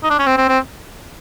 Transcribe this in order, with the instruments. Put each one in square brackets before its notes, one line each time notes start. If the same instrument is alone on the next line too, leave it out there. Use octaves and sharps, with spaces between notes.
[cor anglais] D#4
D4
C#4
C4
C4
C4